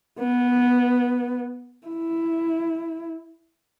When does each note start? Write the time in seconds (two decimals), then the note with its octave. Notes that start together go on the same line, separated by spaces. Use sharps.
0.19 B3
1.87 E4